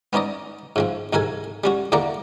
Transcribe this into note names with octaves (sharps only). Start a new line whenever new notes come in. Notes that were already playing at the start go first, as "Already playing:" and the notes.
B3 C#4 D#4 D5 D#5
G#2 F3 C4
C2 G#2 A4 A#4 G#5
G3 C#4 F#4
E2 D3 A#3 D5 F#5 A#5